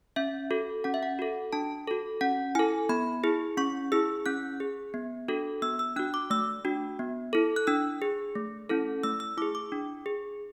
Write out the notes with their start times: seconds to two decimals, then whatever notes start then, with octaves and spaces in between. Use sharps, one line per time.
0.16 C#4 E5
0.51 F#4 A4
0.84 C#4 F#5
0.94 E5
1.03 F#5
1.19 F#4 A4
1.53 D4 A5
1.87 F#4 A4
2.21 C#4 F#5
2.55 E4 A4 G#5
2.89 B3 B5
3.24 E4 G#4
3.57 C#4 C#6
3.92 E4 G#4 E6
4.26 C#4 F#6
4.60 G#4
4.94 B3
5.28 D4 F#4 A4
5.62 B3 E6
5.79 E6
5.96 D4 F#4 F#6
6.14 D6
6.30 A3 E6
6.65 D4 F#4
6.99 B3
7.33 E4 A4
7.56 F#6
7.67 D4 E6
8.02 G#4
8.35 A3
8.69 C#4 E4 A4
9.03 A3 E6
9.20 E6
9.37 E4 G#4 D6
9.55 D6
9.72 D4
10.06 G#4